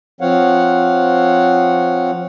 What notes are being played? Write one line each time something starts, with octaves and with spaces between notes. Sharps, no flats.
F3 C4 C#5 F5 F#5